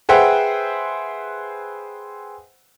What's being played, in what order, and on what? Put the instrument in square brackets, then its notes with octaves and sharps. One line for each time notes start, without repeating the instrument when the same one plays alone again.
[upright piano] G#4 B4 C5 E5 F#5 G5